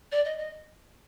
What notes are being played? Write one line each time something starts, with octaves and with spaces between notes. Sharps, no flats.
D5
D#5
D#5